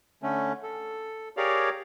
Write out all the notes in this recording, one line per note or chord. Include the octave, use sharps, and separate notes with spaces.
D3 A3 C#4
A4
G4 G#4 A#4 C#5 D5 F5